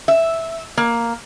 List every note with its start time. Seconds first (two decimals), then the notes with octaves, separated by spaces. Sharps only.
0.08 E5
0.77 A#3